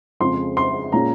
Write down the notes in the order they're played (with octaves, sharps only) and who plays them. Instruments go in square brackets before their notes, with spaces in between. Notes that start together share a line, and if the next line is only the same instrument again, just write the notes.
[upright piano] F2 C#3 F3 G#3 C6
C6
A#2 G#3 C#4 A#5